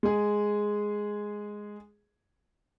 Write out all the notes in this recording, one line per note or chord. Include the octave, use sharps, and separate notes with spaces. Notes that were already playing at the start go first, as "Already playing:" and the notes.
G#3 G#4